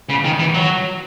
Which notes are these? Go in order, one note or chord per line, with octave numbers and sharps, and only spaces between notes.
C#3
D#3
E3
F#3